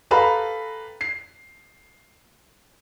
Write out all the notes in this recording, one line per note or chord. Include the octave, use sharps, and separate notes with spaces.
G4 A4 B4 F5 A#5 B5
C7